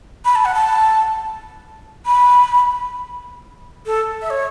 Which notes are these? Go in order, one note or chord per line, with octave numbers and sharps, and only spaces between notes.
B5
A5
F#5
A5
B5
A4
E5
C#5